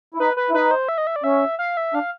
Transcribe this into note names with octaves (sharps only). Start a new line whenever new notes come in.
E4
D#4 B4
B4
E4
D#4 B4
C5
E5
D#5
E5
D5
C#4 E5
F5
E5
D4 F5